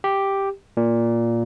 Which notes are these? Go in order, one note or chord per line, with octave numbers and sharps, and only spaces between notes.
G4
A#2